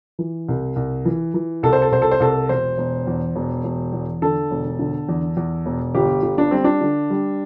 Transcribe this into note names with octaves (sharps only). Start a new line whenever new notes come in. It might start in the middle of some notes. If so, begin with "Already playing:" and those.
E3
C2
C2
E3
E3
C2 A4
C5
A4
C2 C5
A4
C5
C2 A4
E1 C5
E1
E2
E1
E1
E2
D3 A4
E1
D3
E2
E2
E1
G1 G4
G1
D4
G3 C4
D4
D3
G3